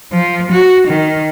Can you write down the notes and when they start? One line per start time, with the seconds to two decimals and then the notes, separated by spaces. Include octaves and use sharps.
0.12 F3
0.52 F#4
0.87 D#3